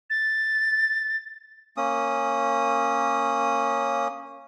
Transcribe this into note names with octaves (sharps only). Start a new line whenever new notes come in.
A6
A#3 C#4 D#6